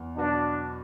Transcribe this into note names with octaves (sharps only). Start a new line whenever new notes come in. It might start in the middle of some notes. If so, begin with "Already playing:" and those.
Already playing: E2
B2 F#3 B3 D4 F#4